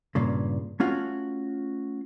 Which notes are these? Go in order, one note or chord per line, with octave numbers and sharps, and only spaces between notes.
G2 A#2 C#3
A3 C#4 F4 F#4